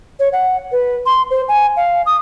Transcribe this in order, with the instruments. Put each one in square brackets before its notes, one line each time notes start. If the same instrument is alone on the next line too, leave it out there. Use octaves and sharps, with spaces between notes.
[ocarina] C#5
F#5
B4
C6
C5
G#5
F5
D#6